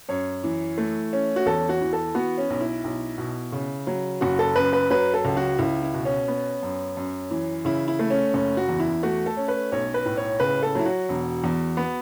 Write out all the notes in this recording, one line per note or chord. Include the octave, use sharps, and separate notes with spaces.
F#2 C#5
E3
A3
C#4
F#4
E2 A4
F#4
E3
A4
B3 F#4
C#4
B1
E4
B1
B2
C#3
F#3
F#1 F#4
A4
F#2 B4
B4
F#3 B4
A4
C#2
F#4
C#2 E4
E4
B2
C#4
B3
F#2
F#2
E3
C#3 E4
E4
A3
C#4
F#1 C#4
F#4
E2
E4
A3 F#4
A4
C#4
B4
B1 C#5
B4
A2
C#5
C#3 B4
A4
F#3 E4
F#4
E1
E2
B3